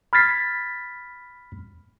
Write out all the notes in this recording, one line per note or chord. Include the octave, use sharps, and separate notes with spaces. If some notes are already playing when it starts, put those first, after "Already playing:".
B5 F6 G#6 A6 B6 C7